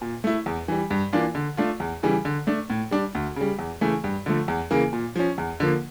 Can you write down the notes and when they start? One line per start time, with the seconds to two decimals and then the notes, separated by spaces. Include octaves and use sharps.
0.02 A#2
0.24 A3 E4
0.46 E2
0.68 E3 G3
0.90 G2
1.13 E3 A#3 D4 F4
1.35 D3
1.57 A3 D4 F4
1.80 E2
2.03 C#3 E3 G3
2.25 D3
2.47 A3 D4
2.70 A2
2.91 G3 D4
3.15 D2
3.36 C#3 G3
3.59 E2
3.81 C#3 E3 A3
4.04 G2
4.26 D3 F3 A3
4.48 E2
4.71 C#3 E3 A#3
4.93 A#2
5.16 F3 C#4
5.38 E2
5.60 D3 F3 A#3